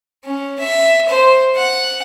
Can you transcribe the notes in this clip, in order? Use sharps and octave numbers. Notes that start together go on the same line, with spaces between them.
C#4
E5
C5
F#5